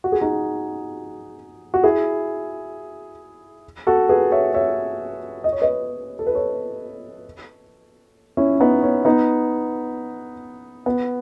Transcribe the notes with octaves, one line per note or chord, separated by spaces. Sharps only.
F#4
G#4
D#4 F#4
F#4
E4 G#4
F#4 A4
G#4 B4
C#5 E5
C#5 E5
D#5
C#5
B4 D#5
A4
B4
A4 C#5
C#4 E4
B3 D#4
C#4
B3 D#4
B3